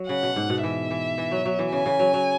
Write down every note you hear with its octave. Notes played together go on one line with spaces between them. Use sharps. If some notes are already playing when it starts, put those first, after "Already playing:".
Already playing: F#3
C#3 F#5
B2
G#2
B2
E3 E5
E3
E3
F#3
F#3
E3
C#3 G#5
C#3
F#3
F#3